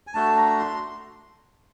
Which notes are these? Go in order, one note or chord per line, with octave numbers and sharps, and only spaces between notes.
G#5
A3 D4 F#4 A5
A#5
C6